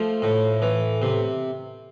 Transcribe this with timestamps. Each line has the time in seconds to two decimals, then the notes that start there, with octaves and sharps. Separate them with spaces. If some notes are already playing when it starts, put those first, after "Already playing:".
Already playing: F3 A3
0.22 A2
0.62 E3
1.02 C3